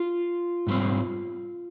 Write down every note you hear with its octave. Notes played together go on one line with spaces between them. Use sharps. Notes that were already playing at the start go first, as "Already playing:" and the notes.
Already playing: F4
G#2 G3 C4